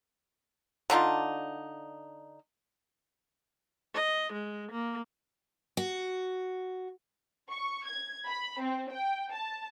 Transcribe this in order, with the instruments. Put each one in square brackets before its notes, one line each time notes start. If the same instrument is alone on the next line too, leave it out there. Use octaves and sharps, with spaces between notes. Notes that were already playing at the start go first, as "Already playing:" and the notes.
[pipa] D3 D4 D#4 F4
[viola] D#5
G#3
A#3
[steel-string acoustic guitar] F#4
[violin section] C#6
G#6
B5
C4
G5
A5